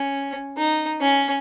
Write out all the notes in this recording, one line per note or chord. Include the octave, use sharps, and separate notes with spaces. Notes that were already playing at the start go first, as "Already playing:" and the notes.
Already playing: C#4
D#4
C#4